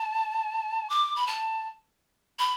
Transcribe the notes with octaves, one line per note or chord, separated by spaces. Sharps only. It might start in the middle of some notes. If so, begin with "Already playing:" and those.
Already playing: A5
D6
B5
A5
B5